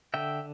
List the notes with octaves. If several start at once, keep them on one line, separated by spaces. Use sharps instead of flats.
D3 E5 G5